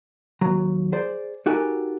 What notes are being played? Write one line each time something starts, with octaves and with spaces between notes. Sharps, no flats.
D#2 F#3 A#5
G#4 C5 D5
D#4 F#4 G4 A4 A#4 G#5